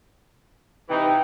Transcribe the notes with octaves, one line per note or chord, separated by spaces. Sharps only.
C3 E3 D#4 B4 G5